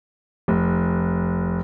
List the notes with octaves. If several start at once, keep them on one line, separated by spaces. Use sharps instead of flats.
F1